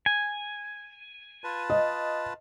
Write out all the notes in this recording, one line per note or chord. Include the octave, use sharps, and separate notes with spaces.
G#5
F4 B4 A5
D#5